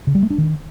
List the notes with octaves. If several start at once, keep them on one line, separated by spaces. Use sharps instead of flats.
C#3
G3
A3
D4
D#3